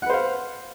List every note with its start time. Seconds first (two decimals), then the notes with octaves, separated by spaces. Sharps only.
0.02 F#5
0.06 B4
0.10 C5
0.13 F5